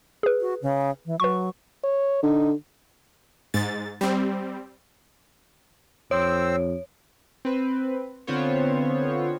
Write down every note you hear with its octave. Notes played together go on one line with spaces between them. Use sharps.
G#4 B4
F#4
C#3
E3
F#3 B4 C#6
C#5
D3 D#4
G#2 A6
G3 C4
F2 C4 C5 C#5 E6
C4 B4
D3 B3 C4 F4 C5 C#5